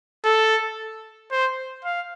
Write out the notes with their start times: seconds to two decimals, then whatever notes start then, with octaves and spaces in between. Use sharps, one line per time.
0.25 A4
1.32 C5
1.85 F5